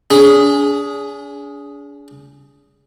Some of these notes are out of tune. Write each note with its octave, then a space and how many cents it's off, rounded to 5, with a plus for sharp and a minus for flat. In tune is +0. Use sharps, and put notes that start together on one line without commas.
D4 -40 G#4 +0